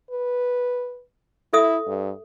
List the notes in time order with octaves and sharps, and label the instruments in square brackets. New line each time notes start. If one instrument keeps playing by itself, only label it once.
[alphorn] B4
[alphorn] E4 [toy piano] A4 E5 D#6
[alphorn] G2